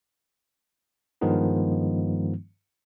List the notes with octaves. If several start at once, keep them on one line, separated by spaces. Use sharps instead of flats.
G2 D#3 F3 G#3 B3 D#4